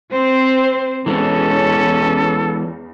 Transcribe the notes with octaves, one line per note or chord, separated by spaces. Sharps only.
C4 C5
E2 E3 G#3 B3 C#4 A4